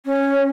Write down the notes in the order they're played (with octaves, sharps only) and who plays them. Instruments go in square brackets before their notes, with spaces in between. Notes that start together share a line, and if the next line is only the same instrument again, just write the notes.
[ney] C#4